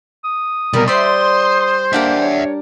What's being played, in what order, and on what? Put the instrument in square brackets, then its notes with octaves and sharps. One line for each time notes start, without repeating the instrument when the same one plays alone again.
[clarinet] D#6
[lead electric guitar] C2 B2 [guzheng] G3 [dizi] A#4
[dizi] C5 [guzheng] D5 E5 [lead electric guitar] C6 [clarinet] D#6
[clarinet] A#3 [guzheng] D4 G4 A#4 [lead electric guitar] E5 F#5
[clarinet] C#5